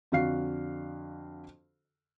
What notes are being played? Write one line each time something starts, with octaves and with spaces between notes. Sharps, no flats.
F2 D3 F#4 F5 C7